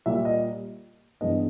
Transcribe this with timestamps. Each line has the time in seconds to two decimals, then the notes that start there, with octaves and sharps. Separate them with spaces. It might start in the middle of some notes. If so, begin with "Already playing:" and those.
0.06 A#2 G3 A#3 E5
0.25 D#5
1.21 G2 E3 G#3 B3 D4 D#5